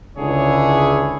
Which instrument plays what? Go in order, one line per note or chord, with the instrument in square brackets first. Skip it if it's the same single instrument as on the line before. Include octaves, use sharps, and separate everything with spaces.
[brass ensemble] C#2 D3 E4 G#4 C#5